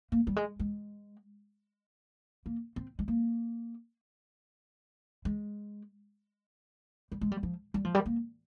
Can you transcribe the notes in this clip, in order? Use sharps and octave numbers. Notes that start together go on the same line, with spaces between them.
A#3
G3
G#3
G#3
A#3
C4
G#3
A#3
G#3
G3
G#3
G3
F3
G3
F3
G3
A#3